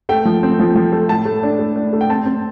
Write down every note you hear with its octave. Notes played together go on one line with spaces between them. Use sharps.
A3 G5
F3
C4
F3
F3
A3
A2 A5
A3
D4
A3
D4
A3
G5
C4 A5
C4